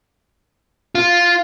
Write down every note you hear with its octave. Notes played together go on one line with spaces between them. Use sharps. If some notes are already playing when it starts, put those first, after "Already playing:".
F4